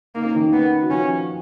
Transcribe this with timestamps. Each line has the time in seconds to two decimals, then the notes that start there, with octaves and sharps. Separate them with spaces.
0.15 A#3 D#4
0.25 C#4
0.35 D#3 D#4
0.53 B3
0.82 F#4
0.91 F3 C#4 F4